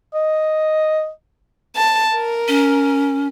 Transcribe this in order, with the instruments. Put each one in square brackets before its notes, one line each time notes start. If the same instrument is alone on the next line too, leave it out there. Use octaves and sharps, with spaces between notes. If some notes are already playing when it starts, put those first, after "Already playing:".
[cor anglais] D#5
[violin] A5
A#4
[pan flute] C#4